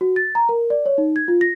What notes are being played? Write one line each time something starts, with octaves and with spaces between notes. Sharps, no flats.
F#4
A6
A#5
A#4
D5
C#5
D#4
G#6
F4
A#6